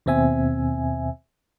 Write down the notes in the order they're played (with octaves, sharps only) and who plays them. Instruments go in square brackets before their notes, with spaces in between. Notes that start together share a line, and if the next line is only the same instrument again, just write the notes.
[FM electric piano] D#2 B2 C4 E5 G#5